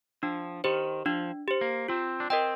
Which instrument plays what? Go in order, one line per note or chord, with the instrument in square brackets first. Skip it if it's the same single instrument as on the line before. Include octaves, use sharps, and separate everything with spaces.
[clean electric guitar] F3 [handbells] D4
[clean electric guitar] D#3 [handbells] G4 C5
[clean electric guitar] F3 [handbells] D4
[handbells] G4 C5
[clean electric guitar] A#3
[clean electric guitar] C4 [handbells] F4
[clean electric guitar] D4
[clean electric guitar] C4 [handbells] A#4 D#5 G5